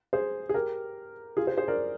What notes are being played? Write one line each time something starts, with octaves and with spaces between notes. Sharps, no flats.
G#4 C5
G#4
G4 A#4
F4 G#4
G#4 C5
G#4 C5
A#4 D5